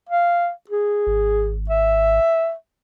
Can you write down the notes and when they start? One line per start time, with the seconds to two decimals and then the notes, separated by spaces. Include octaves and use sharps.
0.09 F5
0.70 G#4
1.07 G#1
1.70 E5